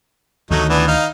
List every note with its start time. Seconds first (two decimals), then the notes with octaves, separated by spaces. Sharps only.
0.51 D2 D#3 F#3 A3 D#4
0.69 E3 B3 D4
0.88 D#4 F5